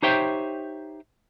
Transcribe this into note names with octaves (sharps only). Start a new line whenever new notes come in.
D#4 G4 C5 C#5 E5 G5